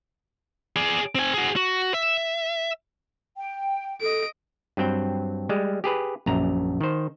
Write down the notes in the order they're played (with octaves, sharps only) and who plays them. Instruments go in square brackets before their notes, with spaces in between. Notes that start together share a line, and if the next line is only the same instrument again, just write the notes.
[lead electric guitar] G#4 D5
C4 G#5
F#4 G#4
F#4
E5
[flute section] G5
[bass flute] A4 [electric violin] D#5 D7
[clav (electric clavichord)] G2 F#3 C4 G5
G3 G#3
G4 G#4 B4
A#1 F#2 A#5
D#3 C5